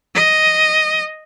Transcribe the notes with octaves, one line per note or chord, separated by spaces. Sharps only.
D#5